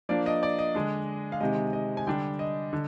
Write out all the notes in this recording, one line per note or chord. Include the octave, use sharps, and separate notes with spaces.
F3 A#3 D4 D5
D#5
D5
D#5
D3 G#3 D4
F5
C3 D#3 G#3 D#5
D#5
G#5
D3 G3 D4 G5
D#5
D3